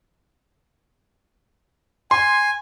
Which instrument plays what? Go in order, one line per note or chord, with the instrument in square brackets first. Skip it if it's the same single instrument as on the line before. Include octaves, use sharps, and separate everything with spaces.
[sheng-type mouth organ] G#5 [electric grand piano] C6